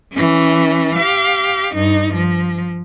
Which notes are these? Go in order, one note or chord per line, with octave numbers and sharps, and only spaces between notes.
E3 C#4
G4 F5
G2 D#4
F3